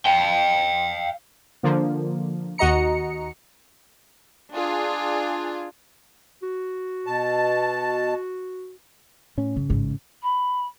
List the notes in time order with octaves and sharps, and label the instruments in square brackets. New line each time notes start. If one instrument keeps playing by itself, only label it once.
[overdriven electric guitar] F5 G5
[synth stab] D3 F3 A#3
D#2 F#4 D#5 A#5 C#7
[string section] D4 F4 G#4
[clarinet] F#4
[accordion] B2 A5
[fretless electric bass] A2 C#4
[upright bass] G2 [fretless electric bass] C#3
[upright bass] A1 G#2
[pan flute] B5